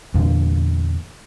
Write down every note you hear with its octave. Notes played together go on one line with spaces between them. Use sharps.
E2 A#2 D3